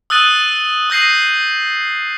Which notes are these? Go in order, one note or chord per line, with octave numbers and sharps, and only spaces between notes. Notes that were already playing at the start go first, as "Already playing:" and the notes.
D#6 E6 F#6 A6 D#7
D#6 G6 A#6 C7 D#7